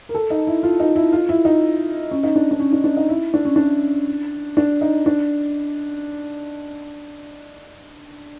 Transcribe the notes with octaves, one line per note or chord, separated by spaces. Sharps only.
A#4
A4
D#4
E4
F4
D#4
E4
F4
E4
D#4
C#4
D#4
D4
D4
C#4
D4
D4
D#4
E4
D4
C#4
D4
D4
D#4
D4